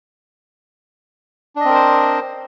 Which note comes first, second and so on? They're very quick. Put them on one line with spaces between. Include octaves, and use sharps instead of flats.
D4 D#5 C4 A#4 C5